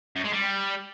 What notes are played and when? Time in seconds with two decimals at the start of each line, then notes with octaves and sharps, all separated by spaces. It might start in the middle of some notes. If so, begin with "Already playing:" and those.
0.16 F#2
0.25 G#3
0.33 G3